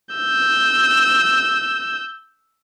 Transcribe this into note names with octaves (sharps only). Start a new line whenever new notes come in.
E6 G6